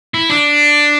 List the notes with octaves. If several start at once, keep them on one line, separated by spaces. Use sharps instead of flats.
E4
D4